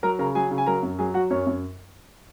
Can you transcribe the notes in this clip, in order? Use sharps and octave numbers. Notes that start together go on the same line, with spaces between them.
F#3 A#4 A#5
C#3 A#4 A#5
F#3 G#4 G#5
C#3
G#5
F#3 A#4 A#5
F#2
F#3 G#4 G#5
F#3 F#4 F#5
F#2 C#4 C#5
F#2